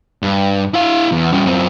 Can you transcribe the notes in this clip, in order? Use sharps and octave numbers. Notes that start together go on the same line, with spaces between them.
G2
E4 F5
E2
G3 C#4
F#2 C4